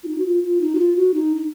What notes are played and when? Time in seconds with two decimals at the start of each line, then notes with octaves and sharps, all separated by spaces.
0.04 F4
0.08 D#4
0.18 F#4
0.26 F4
0.43 F4
0.61 D#4
0.75 F#4
0.79 F4
0.97 F#4
1.14 D#4
1.37 D#4